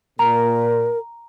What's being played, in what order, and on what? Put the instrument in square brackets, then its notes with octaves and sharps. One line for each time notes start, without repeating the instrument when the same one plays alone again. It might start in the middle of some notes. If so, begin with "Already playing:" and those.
[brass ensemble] A#2 [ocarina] A#4 [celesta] A#5